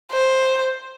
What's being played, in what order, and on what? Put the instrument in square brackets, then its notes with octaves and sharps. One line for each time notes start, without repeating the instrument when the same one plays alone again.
[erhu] C5